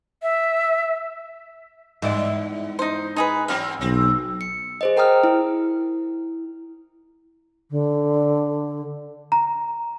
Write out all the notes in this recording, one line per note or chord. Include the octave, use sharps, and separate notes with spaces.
E5
E2 G#2 E4 D5
D#4 C5
D#4 G#4 B4
E3 F#3 C4 F5
B1 C4
C#7
G#4 C5 D#5
A#4 G5 A#5 D#6 F6
E4
D3
A#5